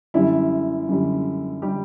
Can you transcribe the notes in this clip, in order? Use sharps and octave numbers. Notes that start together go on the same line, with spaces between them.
F#2 D3 G3 E4
F#2 D3 G3
D3 G3 G4